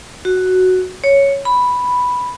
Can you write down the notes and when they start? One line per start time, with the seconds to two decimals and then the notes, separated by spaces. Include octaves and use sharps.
0.25 F#4
1.04 C#5
1.45 B5